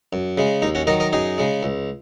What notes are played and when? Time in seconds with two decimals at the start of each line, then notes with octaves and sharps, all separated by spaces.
0.13 F#2
0.38 C#3 G#3
0.62 D#2 D#4
0.75 C#4 F#4
0.87 D#3 F#3 A#4 D#5
1.00 A#4 D#5
1.13 F#2 D#4 G#4
1.38 C#3 G#3
1.63 C#2